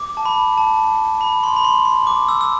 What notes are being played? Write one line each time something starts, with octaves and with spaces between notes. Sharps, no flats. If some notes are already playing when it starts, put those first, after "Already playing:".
Already playing: D6
A5
B5
A5
B5
C6
B5
C6
C6
D6
E6
E6